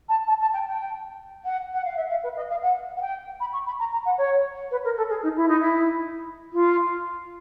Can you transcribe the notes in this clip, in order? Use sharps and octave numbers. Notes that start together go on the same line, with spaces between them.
A5
A5
A5
G5
G5
F#5
F#5
F5
E5
F5
B4
D#5
F5
F#5
F#5
G5
B5
C#6
B5
A#5
A#5
F#5
C#5
B4
A#4
A4
G#4
D#4
E4
D#4
E4
F4